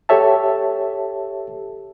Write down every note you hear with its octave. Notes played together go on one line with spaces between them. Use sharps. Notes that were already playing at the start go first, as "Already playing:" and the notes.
G4 A4 C#5 E5 A5